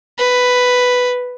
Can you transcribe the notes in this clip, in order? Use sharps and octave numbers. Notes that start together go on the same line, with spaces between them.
B4